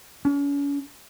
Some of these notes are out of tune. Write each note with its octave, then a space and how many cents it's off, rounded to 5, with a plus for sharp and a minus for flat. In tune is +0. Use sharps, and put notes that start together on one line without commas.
C#4 +40